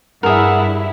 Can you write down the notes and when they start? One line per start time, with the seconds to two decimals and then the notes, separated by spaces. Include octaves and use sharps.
0.23 G2 E4 G#4 A#4 E5 F#5